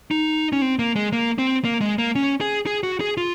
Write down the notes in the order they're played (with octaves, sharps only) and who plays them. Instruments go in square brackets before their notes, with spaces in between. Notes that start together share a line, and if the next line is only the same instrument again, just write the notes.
[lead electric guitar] D#4
C#4
C4
A#3
G#3
A#3
C4
A#3
G#3
A#3
C#4
G#4
G#4
F#4
G#4
F4